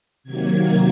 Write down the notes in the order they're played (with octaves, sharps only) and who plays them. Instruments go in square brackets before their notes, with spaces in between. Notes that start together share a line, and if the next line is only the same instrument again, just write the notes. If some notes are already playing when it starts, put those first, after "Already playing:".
[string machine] C3 D#3 F#3 A#3 G#6